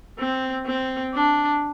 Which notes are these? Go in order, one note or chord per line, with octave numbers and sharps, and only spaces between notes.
C4
C4
D4